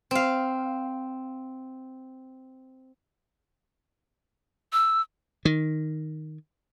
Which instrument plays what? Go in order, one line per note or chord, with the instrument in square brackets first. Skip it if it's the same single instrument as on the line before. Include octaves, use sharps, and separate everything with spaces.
[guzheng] C4 F5
[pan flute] E6
[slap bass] D#3